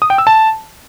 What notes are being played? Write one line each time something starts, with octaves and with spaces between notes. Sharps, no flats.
D#6
G5
E6
A5